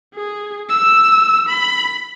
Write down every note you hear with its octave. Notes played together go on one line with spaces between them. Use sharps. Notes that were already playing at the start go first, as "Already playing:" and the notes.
G#4
E6
B5